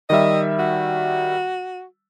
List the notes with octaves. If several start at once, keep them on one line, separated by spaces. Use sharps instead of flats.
D#3 G3 D#5 E5
F#4